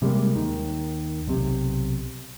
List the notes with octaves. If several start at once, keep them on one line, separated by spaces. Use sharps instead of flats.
C3 G3 G#3 A#3
D#2 D#3
B1 C3